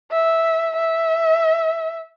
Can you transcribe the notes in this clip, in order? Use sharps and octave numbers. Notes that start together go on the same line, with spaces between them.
E5
E5